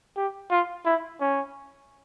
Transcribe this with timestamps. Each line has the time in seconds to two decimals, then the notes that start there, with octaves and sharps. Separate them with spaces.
0.17 G4
0.51 F4
0.86 E4
1.21 C#4